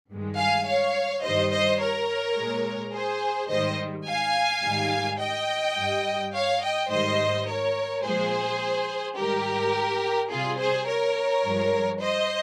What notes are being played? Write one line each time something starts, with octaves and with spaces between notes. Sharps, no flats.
G2 D#3 G#3
F5 G#5
C#5 F5
G2 D#3 G3 C5 D#5
C5 D#5
A#4 C#5
A#2 G#3
G#4 C5
G#2 D#3 G3 C5 D#5
F5 G#5
G#2 D#3 G3
D#5 G5
G2 G3
C#5 F5
D#5 G5
G#2 D#3 G3 C5 D#5
A#4 C#5
A#2 F3 G#3 G#4 C5
G#2 D#3 G3 G4 A#4
C3 G3 F4 G#4
G#4 C5
A#4 C#5
G2 F3 G#3
C5 D#5